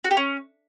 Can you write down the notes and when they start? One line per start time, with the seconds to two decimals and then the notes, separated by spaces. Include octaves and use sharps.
0.04 F#4
0.11 G4
0.17 C#4